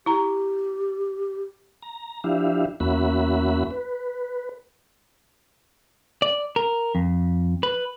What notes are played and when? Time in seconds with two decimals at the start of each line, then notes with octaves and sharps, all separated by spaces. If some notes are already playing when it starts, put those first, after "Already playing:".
0.06 E4 G4 A#5
1.83 A#5
2.24 F3 D4 E4 G4 E5 F5
2.80 E2 A#3 C#4 F#4 E5 B5
3.71 B4
6.22 D5
6.56 A#4
6.95 F2
7.63 B4